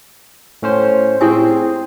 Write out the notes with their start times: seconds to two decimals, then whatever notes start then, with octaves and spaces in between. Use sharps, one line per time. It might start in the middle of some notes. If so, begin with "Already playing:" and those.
0.63 A2 C#4 C5
1.21 C4 E4 G4 G#4 C5 G#5